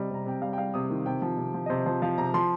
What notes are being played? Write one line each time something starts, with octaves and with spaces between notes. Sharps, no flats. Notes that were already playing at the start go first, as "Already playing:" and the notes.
Already playing: C3 G3 D#5
C3 A#5
C3 G5
G3 F5
G5
G3 F5
C3 D#6
D#3
C3 G5
F3
C3
F3
D#5
C3 C5
F3 C5
F3 F5
C3 A#5
F3 C6